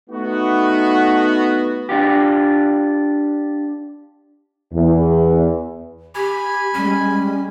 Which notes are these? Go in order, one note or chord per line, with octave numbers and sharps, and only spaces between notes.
A3 B3 D#4 F#4
D4 F4 G4
E2
G4 G#5 B5
G3 G#3 C#4